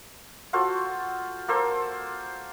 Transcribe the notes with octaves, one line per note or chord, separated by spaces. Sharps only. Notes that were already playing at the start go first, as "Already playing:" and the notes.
F4 F#4 A4 C5
A#3 A4 C5